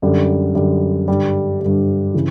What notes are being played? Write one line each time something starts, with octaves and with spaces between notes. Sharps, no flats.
F#2 D3 G3
F#2 D3 G3
G2 D3 G3
G2 D3 G3
C#3 E3